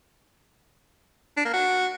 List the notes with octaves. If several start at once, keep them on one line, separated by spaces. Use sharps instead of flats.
D4
A#3
F#4